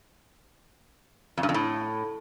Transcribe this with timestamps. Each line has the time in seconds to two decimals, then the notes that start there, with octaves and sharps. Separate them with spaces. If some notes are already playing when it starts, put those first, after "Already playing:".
1.37 F2
1.43 G2
1.49 F2
1.54 A2